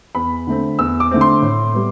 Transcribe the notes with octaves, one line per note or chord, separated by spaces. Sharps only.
E2 B5
D3 A3 C4
E2 E6
D6
D3 A3 C4
C6
A2
G3 B3